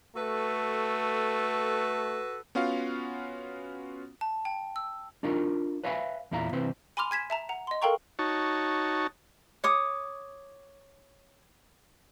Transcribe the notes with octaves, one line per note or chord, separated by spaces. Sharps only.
A3 F#4 A4 B4
B3 C#4 F4 F#4 F5
A5
G5
E6
D4 D#4 F4 A#4
B4 C#5 E5 F5 G#5 B5
E2 A#2 E4 F5 A#5
C3 E3 C4 E4 B4 C5
G#5 B5 C6 D6 F6 F7
G#5 G#6 B6 E7
E5 A5 A#5
F#5 A#5
D#5 C6
A4 A#4 F5 G5 A#5 C#6
D#4 F#4 C#5 A5
C#5 D6 D#6